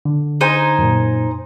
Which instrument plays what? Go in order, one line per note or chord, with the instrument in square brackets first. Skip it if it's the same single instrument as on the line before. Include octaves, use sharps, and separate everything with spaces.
[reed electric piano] D3
[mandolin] D#4 C5 G#5
[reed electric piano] F#2 A#2